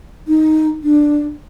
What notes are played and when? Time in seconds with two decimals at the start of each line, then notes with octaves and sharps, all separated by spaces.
0.27 D#4
0.83 D4